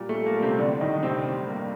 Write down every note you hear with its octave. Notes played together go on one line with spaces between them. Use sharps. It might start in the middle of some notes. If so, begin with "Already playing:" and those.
Already playing: A#2 G3
A3
G3
A#3
G3
C3 C4
A2 D3 D4
A2 D#3 D#4
A2 C3 C4
G3
G2 A#3